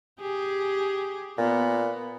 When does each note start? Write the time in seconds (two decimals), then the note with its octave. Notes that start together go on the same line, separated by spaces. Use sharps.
0.20 G4 G#4
1.38 A#2 B3